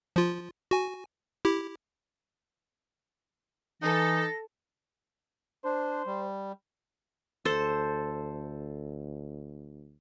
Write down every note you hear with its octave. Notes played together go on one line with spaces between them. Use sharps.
F3 F4
F#4 G#5
E4 G4
E3 D#4 A4 A#6
D4 C5
G3
D2 A4 C5